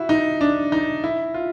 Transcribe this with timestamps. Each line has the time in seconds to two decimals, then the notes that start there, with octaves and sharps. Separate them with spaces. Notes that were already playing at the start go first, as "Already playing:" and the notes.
Already playing: E4 F#4
0.09 D#4
0.41 D4
0.72 D#4
1.04 E4
1.34 F4